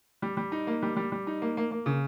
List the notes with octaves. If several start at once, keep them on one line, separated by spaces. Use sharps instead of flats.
G3
G3
D#4
A#3
G3
G3
G3
D#4
A#3
A#3
A#3
C#3